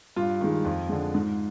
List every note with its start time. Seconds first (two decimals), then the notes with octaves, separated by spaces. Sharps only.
0.16 G2 F4
0.41 D#3 G#3
0.65 F2
0.89 D3 G#3
1.15 G#2